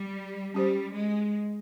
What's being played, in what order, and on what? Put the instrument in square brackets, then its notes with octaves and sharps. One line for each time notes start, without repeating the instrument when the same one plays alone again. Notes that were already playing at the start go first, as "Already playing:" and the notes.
Already playing: [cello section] G3
[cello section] G3 [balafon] C#4 G4 C5
[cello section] G#3